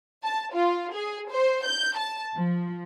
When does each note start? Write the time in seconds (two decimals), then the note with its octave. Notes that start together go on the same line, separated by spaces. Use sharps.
0.23 A5
0.53 F4
0.94 G#4
1.30 C5
1.65 G6
1.97 A5
2.34 F3